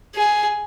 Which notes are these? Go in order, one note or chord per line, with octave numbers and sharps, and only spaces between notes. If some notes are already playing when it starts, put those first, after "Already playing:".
G#4